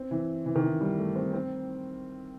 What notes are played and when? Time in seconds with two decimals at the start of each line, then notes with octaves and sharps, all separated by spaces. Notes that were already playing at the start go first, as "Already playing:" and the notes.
Already playing: C4
0.11 E3
0.46 E3
0.56 D#3
0.63 E3
0.81 G3
0.98 A3
1.16 C4
1.33 C4